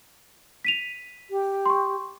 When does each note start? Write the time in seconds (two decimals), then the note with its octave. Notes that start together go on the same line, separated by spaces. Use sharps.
0.65 B6 D#7 F7
1.30 G4
1.66 C6 C#6